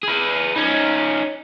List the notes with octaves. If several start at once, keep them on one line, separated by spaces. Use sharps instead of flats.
G#4 B4
C#4 D#4